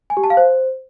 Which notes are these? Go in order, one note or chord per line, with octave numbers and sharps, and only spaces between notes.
G#5
G4
A5
F5
C5